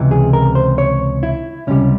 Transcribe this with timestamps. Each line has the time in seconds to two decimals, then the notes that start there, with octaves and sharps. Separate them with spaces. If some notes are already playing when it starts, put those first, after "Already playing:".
Already playing: C#2 C3 E3
0.11 G#4
0.33 A#4
0.55 C5
0.78 C#5
1.23 E4
1.67 C#2 C3 G3 C#4